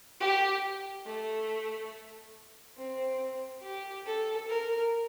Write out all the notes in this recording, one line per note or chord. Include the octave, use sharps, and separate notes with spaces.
G4
A3
C4
G4
A4
A#4